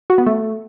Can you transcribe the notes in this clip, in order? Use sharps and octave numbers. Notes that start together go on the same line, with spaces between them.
F#4
B3
A3